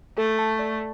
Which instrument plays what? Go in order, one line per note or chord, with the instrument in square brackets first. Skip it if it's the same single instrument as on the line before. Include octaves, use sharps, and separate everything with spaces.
[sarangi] A3 [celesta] A4
[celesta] A5
D5